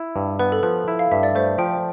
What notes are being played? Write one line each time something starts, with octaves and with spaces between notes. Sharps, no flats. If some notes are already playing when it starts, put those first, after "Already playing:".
Already playing: E4
G2
B3 B4
A4
F3 B4
E4
F5
G2 E5
D5
A3 C5
F3 G5